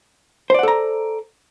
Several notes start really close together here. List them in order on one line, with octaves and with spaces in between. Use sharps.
C5 D5 F#5 A4 A#5